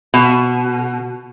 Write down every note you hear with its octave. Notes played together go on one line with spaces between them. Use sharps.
B2